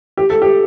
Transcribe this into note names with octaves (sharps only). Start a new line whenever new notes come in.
G4
A4
G4